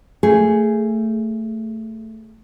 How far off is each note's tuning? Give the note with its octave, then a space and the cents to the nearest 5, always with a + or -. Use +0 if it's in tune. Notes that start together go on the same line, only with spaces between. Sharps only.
A3 +15 G#4 +0